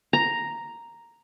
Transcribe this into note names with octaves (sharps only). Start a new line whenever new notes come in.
A#5